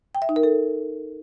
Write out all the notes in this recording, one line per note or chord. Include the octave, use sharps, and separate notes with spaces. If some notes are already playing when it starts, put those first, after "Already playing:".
G5
E5
D#4
A#4
A4